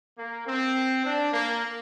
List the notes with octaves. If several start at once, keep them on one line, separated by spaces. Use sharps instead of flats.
A#3
C4
D4
A#3